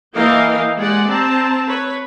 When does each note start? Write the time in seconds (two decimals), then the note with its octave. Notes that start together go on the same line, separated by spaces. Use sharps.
0.14 E3 A#3 A#4 D#5 F5 G5
0.77 G#3 G4 D5 F#5
1.09 C4 A5 A#5
1.68 B4 C#5